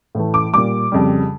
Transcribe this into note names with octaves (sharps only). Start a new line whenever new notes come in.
A2 E3 A3
D6
A#2 G3 D6
F2 C#3 G3